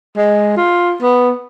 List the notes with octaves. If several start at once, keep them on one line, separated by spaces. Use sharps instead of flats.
G#3
F4
B3